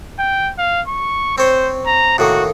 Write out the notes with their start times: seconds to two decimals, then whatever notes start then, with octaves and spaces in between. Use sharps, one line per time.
0.19 G5
0.58 F5
0.88 C#6
1.38 C4 C5 C#5
1.86 A#5
2.18 A2 D#3 A#3 F#4